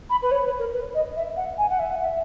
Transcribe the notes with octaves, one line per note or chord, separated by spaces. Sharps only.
B5
B4
C#5
B4
A#4
B4
D#5
E5
F#5
G#5
F#5
E5
F#5
E5